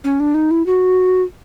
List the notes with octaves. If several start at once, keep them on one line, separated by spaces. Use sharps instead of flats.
C#4
D4
D#4
E4
F#4